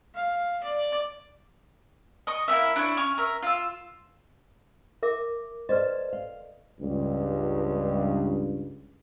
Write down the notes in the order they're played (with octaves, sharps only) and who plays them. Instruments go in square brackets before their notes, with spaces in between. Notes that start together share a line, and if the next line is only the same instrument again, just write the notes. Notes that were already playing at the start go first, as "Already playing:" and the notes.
[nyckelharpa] F5
D5
[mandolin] D#5 C#6
A#3 C4 E4 E5
D4 E4 C5 C#5
C#4 C#6 F6
A#4 E5
F4 E6
[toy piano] A#4 E5 D6
[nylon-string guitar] A4 C5 [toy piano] B4 D5 D#5
[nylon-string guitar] F5
[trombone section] C#2 G2